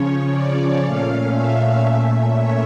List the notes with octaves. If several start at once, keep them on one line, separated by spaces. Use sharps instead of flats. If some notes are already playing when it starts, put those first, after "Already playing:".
Already playing: C#3 F3 C#4 C#5
D5
A#2 A3 C#4 F5
E5
A#2 A3 C#4 E5
C#5